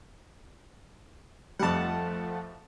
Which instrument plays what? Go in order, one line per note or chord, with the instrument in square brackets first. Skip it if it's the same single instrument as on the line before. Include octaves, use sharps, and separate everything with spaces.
[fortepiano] F2 G3 [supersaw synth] F3 A3 [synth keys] F#5 A5